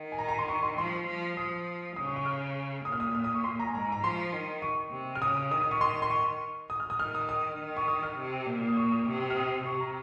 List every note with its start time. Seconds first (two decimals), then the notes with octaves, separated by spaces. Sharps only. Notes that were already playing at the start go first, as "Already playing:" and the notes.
Already playing: D#3
0.12 G#5
0.19 A#5
0.29 A#5
0.39 C6
0.48 C#6
0.63 C6
0.78 F3 C6
1.08 F3
1.37 F3 D#6
1.96 C#3 D#6
2.06 C#6
2.16 C#6
2.26 F6
2.85 A#2 D#6
2.92 F6
3.00 D#6
3.15 F6
3.24 D#6
3.34 C#6
3.44 C6
3.60 A#5
3.67 G#5
3.73 G#2 A#5
3.92 A#5
4.04 F3 C6
4.33 D#3
4.62 C#6
4.92 C3
5.15 F6
5.22 C#3 D#6
5.51 D#3 D#6
5.62 D#6
5.71 C#6
5.81 C6
6.02 C6
6.10 C#6
6.70 D#6
6.80 F6
6.90 D#6
6.99 D#3 F6
7.15 D#6
7.29 D#6
7.59 D#3
7.77 C#6
7.88 D#6
8.03 F6
8.17 C3
8.47 A#2
8.68 D#6
8.77 C#6
8.92 D#6
9.07 C3
9.30 F6
9.36 D#6
9.66 C3 C#6
9.80 A#5